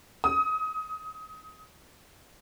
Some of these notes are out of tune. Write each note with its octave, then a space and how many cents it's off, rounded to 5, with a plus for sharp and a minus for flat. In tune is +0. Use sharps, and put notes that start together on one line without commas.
D#6 +25